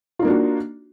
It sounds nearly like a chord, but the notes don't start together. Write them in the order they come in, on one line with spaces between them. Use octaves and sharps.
F4 D#4 A#3 D4 F#4